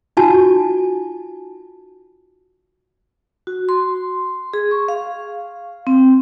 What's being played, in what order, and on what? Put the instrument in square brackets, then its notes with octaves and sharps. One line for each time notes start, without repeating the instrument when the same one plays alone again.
[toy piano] D#4 F4 F#4 G#5 A5
[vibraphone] F#4
C6
G#4
C#6
F5
C4